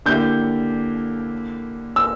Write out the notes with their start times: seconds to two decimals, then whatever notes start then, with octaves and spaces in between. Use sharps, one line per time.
0.06 D3 A#3 E4 G4 G6
1.96 E6